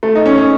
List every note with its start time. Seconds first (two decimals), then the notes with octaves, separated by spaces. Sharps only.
0.03 A3
0.15 D#4
0.26 C#4
0.38 C#4